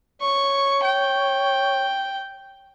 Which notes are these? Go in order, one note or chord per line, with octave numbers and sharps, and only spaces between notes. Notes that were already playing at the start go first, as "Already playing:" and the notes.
C#5 C#6
G5